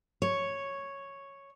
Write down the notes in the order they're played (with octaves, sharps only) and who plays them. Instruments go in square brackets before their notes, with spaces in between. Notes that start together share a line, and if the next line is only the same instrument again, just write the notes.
[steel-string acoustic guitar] C#5